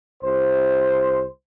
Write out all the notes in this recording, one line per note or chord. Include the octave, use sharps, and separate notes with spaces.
C2 C5